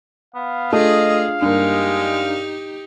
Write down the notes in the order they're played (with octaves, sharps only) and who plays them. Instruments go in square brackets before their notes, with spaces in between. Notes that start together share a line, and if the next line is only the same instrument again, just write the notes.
[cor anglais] B3 [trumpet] F5
[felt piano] A3 [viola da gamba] D4 F4 G#4 [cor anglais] D#5
[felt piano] G2 A#3 [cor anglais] G#3 [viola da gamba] D#4 G4